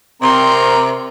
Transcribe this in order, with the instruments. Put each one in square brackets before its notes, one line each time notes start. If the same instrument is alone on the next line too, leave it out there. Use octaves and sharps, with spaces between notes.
[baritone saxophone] C3 [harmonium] C4 A#5 [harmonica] A#4 [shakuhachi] C6